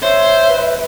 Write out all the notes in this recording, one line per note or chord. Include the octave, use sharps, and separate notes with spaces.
C5 C#5 E5
B4